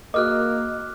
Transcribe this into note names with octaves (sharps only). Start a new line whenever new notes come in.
A#3 F#4 G#4 A#4 D#5 D6 F6 F#6